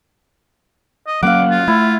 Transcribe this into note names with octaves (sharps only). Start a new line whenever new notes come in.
D#5
F#3 A#3 C#4 F5 F#5 D6
F4
A3 E4